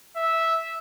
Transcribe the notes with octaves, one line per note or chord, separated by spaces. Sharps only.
E5